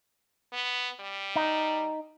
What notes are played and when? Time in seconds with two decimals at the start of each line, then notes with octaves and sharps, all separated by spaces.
0.53 B3
1.00 G3
1.36 D#4